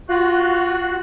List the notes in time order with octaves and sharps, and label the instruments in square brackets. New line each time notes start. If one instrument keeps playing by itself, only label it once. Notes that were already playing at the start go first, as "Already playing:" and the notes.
[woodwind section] F4 [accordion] F#4 F#6